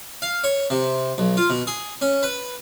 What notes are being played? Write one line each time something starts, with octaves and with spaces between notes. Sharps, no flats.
F5
C#5
C3
B1
F4
B2
G#4
C#4
B4